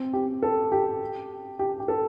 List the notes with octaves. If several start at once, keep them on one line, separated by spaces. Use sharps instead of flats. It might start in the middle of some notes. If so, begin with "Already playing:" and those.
Already playing: C4
G4
A4
G4
G4
G4
A4